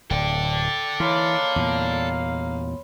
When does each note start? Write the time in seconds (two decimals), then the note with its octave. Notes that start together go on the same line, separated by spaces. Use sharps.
0.10 D1 A4 D5 G5
1.00 E3 A#3 D#4 C#5 F5 B5 C6
1.56 E2 A#2